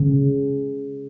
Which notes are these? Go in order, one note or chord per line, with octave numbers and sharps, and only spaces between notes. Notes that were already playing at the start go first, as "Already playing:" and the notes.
Already playing: C#3